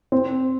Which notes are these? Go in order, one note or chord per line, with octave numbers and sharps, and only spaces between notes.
C4